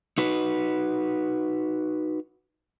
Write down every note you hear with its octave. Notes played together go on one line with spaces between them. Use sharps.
D#4 F#4 B4